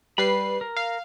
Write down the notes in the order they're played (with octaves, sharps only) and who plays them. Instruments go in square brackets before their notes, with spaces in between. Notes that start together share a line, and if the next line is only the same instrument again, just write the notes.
[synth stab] G3 B4 C7 [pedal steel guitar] B5
[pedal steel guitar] A#4
[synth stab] F5